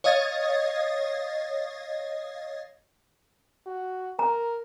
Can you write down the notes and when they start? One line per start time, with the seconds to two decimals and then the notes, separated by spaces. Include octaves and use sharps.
0.04 C#5 D#5 F5 D#6 G#6 A6
3.66 F#4
4.19 A#4 A#5